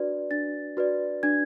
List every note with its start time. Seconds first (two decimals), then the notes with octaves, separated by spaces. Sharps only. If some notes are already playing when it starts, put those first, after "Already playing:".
Already playing: D4 F#4 B4 D5
0.31 D4 A6
0.77 F#4 B4 D5
1.23 D4 G#6